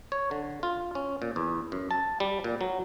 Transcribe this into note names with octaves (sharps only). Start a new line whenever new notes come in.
C#5
D3
F4
C#4
A#2
E2
F#2
A5
G3
A#2
F#3